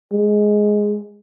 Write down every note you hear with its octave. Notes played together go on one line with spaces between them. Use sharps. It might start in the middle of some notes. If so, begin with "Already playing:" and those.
G#3